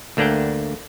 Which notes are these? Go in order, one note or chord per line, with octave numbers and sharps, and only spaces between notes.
D2 A3 A#3 D4 F#5 G5